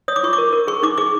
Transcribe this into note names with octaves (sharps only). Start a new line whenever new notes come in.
C#5 D#6
D6
F4 C#6
D6
A#4
A#4
G#4 C#6
D#4 D6
G#4 D6